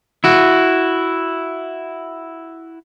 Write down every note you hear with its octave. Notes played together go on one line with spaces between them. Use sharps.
E4 F#4